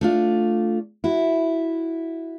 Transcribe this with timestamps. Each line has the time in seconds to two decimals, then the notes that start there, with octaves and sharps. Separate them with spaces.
0.01 A3 D4 F4
1.04 E4 F#4